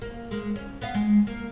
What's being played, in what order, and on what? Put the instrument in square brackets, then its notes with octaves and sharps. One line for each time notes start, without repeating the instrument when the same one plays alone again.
[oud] A#3
G#3 A#3
C#4
B3 D#5 F5
G#3
A#3